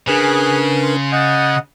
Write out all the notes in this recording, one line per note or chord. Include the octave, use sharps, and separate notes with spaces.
C#3 D4 G#4 A#4 B4 F#6
C6
D#5 F#5 G6 A6